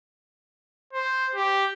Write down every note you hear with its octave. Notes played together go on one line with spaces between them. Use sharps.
C5
G4